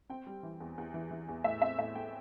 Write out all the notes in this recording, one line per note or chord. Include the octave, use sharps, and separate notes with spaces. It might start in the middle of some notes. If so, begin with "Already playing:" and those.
C4 G5
G3
E3
E2
E2
E3
E3
E2
A2 E5
C4 E5
A2 E5
A3 G5